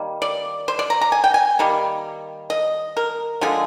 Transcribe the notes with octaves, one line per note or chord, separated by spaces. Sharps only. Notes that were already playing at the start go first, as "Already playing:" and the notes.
Already playing: D#3 G3 A#3
D5
C5
D5
A#5
A#5
G#5
G5
G#5
D#3 G3 A#3
D#5
A#4
D3 F3 G#3 G#4